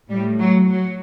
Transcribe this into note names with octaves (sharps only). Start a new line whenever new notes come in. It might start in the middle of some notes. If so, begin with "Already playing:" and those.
A2 G3
F#3
F#3